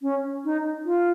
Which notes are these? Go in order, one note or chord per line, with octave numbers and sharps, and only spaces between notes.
C#4
D#4
F4